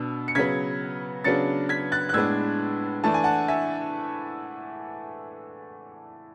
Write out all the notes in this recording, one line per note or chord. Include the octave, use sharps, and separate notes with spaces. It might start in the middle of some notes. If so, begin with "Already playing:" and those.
Already playing: B2 D4 E6
C#7
C#3 F#3 B3 G#6 B6
C#3 F#3 B3 D4 A6 C#7
G#6 B6
F#6 A6
F#6
A2 G#3 B3 D4 E6 G#6
E3 A3 D4 A5
G#5
F#5 A5
E5 G#5